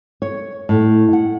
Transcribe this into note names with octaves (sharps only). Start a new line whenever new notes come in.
C#5
A2
F#5